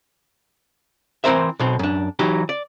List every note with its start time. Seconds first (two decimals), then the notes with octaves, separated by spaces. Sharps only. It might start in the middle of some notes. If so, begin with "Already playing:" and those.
1.24 E3 C4 A#4 C5 E5
1.59 B1 B2 C4
1.79 F#2 D4
2.19 E3 F#3 D#4 G4
2.49 D5